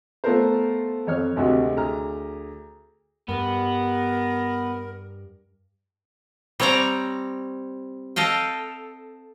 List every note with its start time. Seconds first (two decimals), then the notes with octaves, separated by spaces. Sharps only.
0.24 A3 B3 F4 A4 A#4 C5
1.07 F2 C#5 F6
1.36 G#1 D2 C3 F#4
1.77 D2 G#4 A#5 F6
3.29 G2 B3 A#4
6.60 G3 C4 C#5 D5 A#5
8.16 A4 D#5 F5 G5